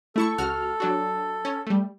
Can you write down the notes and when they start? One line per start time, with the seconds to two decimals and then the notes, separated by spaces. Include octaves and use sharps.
0.16 A3 E4 A4 C#6
0.38 C#2 F#4 F6
0.80 F#3 D4 F#4
1.45 C#4
1.67 G3 A3